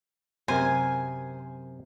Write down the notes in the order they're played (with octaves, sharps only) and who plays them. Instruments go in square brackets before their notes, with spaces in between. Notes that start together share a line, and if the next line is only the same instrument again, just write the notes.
[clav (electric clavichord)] F#2 C3 A#4 [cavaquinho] C5 [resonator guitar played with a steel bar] G#5